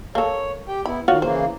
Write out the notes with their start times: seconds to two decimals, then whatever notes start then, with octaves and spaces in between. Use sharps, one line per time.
0.15 A#3 A4 C#5
0.68 G4 G5
0.86 B3 E4 B5
1.08 D#3 F4 F#4 C#5
1.22 C#3 E3 A#3 C5